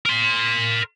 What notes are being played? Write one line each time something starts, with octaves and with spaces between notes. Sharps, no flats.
A#4 C6